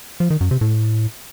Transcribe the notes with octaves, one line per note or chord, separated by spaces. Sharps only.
F3
D#3
F#2
C3
A2